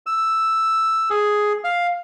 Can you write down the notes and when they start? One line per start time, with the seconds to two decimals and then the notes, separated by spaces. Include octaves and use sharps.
0.06 E6
1.10 G#4
1.64 F5